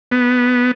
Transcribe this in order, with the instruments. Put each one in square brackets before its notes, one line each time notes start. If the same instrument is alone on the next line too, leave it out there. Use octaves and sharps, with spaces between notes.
[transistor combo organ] B3